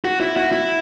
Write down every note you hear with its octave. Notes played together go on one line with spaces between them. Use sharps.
F#4
E4
F#4
E4